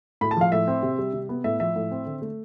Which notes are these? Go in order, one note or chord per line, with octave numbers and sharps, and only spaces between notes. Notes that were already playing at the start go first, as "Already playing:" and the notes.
A2 B5
A5
F3 F5
A2 E5
C4
C3
G3
C3
B3
A2 E5
F3 E5
A2
C4
D3
A3